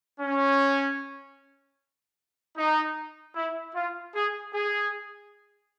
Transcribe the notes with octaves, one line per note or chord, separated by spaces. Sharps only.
C#4
D#4
E4
F4
G#4
G#4